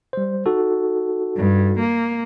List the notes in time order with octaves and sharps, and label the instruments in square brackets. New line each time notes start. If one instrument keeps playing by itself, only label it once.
[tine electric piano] G3 C5
D#4 F#4 A4
[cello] G2
A#3